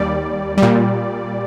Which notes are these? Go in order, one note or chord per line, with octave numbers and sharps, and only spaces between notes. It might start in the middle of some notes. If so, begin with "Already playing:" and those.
Already playing: D#2 G3 D5
A#2 G3